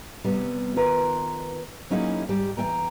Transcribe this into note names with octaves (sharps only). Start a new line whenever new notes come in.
C3 G3 B3
D#3 F4 B4 A#5
F#3 A#3 C#4 D#4 E4 G#4
G#2 G3 G4
E2 E3 A#3 C#4 G5 A#5